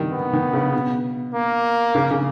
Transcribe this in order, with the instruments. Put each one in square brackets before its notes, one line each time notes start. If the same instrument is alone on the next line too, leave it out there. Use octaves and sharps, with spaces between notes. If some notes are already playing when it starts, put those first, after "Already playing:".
Already playing: [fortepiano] D#3 G3
[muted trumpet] B3
[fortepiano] D#3
C#3
B2
[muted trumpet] A#3
[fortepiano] C#3
C#3